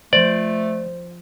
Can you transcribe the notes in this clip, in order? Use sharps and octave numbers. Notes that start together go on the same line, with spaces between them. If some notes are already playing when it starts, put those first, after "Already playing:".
F3 A3 C5 D5